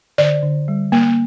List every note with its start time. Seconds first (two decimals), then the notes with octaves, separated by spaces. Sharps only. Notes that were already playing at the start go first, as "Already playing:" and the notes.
0.18 D3 D5
0.43 D3
0.68 G3
0.92 A#3